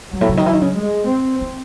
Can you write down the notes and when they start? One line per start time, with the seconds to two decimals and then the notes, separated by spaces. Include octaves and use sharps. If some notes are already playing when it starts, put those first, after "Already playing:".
0.13 F#2 F#3
0.21 A2
0.29 C3
0.37 D#3
0.46 E3
0.53 D#3
0.61 C#3
0.77 G#3
1.09 C4
1.41 E3